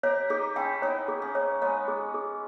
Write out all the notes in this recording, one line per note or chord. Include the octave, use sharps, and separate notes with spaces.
G4 A#4 C#5
D#4 G4 G#4
C#4 E4 G5
B3 D#4 C#5
G#4
A#3 C#4
C#5
G#3 B3 C#5
G#4
G#4